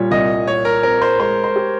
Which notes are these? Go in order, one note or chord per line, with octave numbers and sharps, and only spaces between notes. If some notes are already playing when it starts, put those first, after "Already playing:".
Already playing: A#2 G3 C#5
C2 D#5
A#2 C#5
A#4
C4 A#4
C5
G#3 C5
C5
G4